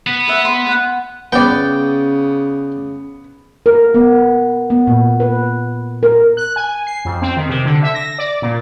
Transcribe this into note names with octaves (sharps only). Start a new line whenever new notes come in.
B3
B4 E5
C6
F#5
C#3 B3 D5 G5
A#4
B3
B3
A#2
B4
A#4
F#6
G#5
C7
F2
C4
D#3
C3
D3
E5
A#6
D5
A#2